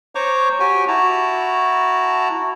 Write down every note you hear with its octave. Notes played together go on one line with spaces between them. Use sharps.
C5 C#5 A#5 C#6 D6
F#4 G4 G5 G#5
E4 F#4 A5 A#5